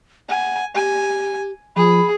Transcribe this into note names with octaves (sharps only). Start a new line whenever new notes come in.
F#5 G#5
G4 G#5
F3 G#4 B5